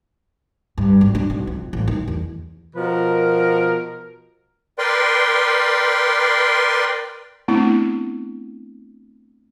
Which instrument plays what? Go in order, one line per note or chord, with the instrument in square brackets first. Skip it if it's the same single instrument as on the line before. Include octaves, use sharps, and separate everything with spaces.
[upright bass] G2
G#1
D4
B1
F2
A1
D#3
E2
[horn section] B2 F3 A#4
[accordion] A#4 B4 D5 G5 C6
[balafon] A3 B3 C4 D4 E4